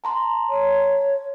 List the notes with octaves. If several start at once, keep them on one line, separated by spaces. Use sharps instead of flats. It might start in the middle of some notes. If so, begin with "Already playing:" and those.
A5 A#5 C6
C#5